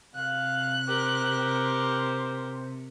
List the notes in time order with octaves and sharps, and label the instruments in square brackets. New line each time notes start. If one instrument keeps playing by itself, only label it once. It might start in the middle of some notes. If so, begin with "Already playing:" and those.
[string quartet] C3 [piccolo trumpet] F5 [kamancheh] F#6
[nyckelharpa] G4 A#4 [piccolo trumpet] C5